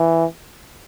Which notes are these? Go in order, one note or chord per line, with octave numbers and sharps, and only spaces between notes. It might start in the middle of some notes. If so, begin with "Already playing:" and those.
Already playing: E3